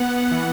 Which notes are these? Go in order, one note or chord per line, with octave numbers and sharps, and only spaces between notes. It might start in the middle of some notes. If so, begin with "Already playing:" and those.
Already playing: B3 F#5
E3